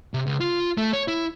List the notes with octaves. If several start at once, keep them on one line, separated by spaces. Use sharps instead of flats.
C3
C#2
F4
A3
C#5
E4